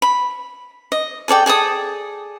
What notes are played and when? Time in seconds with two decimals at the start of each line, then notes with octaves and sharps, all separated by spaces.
0.02 B5
0.92 D#5
1.28 G#4 A4 D5 G5
1.46 G#4 A4 D5 D#6